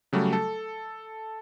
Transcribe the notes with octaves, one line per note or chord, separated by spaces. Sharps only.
C#3 F#3 G3 A3
A4